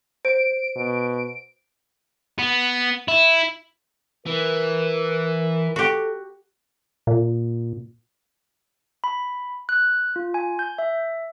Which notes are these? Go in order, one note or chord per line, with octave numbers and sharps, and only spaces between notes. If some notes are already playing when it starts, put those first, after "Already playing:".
C5 D7
B2
B3
E4
E3 A#4
F#4 G4 A4
A#2
B5
F#6
F4
G#5
G6
E5